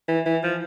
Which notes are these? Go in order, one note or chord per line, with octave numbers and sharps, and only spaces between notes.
E3
E3
F3